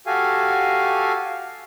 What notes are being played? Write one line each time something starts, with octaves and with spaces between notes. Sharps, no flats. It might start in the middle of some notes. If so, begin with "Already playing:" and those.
F#4 G4 A4 F5 G#5